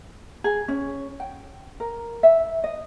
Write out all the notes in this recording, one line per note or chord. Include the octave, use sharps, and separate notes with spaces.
G#4
C#4
G5
A#4
E5
D#5